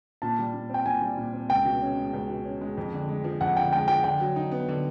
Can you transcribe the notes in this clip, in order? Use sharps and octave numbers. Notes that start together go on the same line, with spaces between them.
A#2 A5
G3
A#2
C4
G5
A#2 G#5
G3
A#2
C4
C#2 G5
B2
C#4
G#3
C#2
B2
C#4
G#3
F2
D3
G#3
F3
F2 F#5
D3 G5
G#3 G5
F3 G5
D3 G5
F#3
D#4
B3
D3